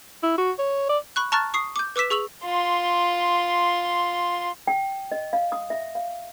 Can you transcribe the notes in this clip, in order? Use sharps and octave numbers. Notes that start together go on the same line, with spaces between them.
E4
F#4
C#5
D5
B5 C#6 F#6
A5 A#5 C#6 F6 F#6 A6
C#6 D#6 C7
D6 G6
B4 D6 E6 B6 E7
G#4 C#6 E6 F7 F#7
F4 C6
G5
D#5
F5
D#6
E5
F5